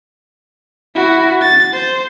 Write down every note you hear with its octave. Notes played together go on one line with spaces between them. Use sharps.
E4 F#4
A6
C5